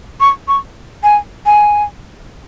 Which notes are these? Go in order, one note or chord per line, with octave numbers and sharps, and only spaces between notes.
C#6
C#6
G#5
G#5